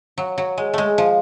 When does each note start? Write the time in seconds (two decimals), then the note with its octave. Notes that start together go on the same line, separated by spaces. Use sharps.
0.18 F#3
0.38 F#3
0.57 G#3
0.73 G#3 A3
0.98 F3